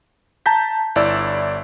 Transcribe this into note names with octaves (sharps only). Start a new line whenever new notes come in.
A5 A#5 G6 B6
G1 E4 D5 E6